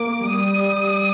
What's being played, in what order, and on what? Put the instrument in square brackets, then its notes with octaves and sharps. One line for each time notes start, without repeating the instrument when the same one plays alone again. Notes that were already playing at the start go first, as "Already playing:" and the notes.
Already playing: [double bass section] A#3 [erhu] D6
[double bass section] G3 [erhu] D#6